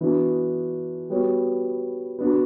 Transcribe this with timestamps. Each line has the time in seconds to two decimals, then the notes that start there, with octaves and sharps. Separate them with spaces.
0.01 E3 B3 D4 F#4
1.10 G3 B3 F#4 C#5
2.19 B3 D4 F#4